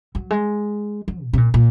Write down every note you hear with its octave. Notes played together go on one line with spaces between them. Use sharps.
F#3
G#3
F#3
A#2
C3
A#2
A#2